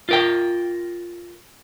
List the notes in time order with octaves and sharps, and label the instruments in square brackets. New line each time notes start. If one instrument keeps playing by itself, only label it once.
[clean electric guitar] F4 A#4 G5